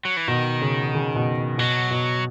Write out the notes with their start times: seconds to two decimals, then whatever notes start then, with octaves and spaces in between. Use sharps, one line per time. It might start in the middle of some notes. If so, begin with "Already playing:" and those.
0.05 F#3
0.17 E3
0.28 B2 D#3
0.61 C#3
0.94 C#3
1.16 B2
1.58 B2 F#3
1.91 B2